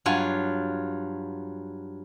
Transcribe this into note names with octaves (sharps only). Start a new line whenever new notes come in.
G2 F#3 F4 G#5